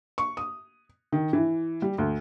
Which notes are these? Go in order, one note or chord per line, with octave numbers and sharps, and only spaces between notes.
C#6
D#6
D#3
E3
G3
D2